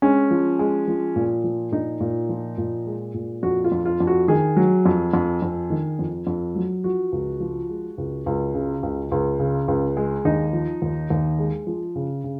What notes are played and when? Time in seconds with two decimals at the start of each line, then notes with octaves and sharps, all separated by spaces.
0.02 G#3 C#4
0.31 F3
0.59 G#3
0.88 F3
1.16 A#2
1.44 F3
1.72 A#2 D#4
2.00 A#2
2.29 F3
2.58 A#2
2.86 G#3
3.14 A#2
3.43 F2 F#4
3.64 F4
3.72 F2
3.85 F4
4.00 F2
4.07 F#4
4.28 D#3 G#4
4.57 F#3
4.86 F2
5.14 F2
5.42 F2
5.70 D#3
5.99 F2
6.27 F2
6.55 F#3
6.84 F3 F#4
7.12 C#2
7.40 F3
7.69 G#3
7.98 C#2
8.26 C#2
8.55 C#3
8.83 C#2
9.12 C#2
9.40 C#3
9.68 C#2
9.97 G#3
10.25 D#2 D#4
10.53 F3
10.82 D#2
11.10 D#2
11.39 G#3
11.67 F3
11.96 C#3
12.24 C#3